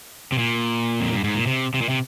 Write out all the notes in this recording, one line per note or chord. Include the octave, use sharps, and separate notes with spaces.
C3
A#2
F2
G2
G#2
A#2
C3
C3
A#2
C3